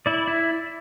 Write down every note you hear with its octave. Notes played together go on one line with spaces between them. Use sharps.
E4 D5
E4